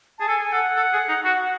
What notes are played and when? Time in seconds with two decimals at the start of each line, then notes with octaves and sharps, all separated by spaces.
0.18 G#4 A5
0.28 A4 G#5
0.52 A4 F#5
0.77 A4
0.93 G#4
1.09 D#4
1.24 F#4 F#5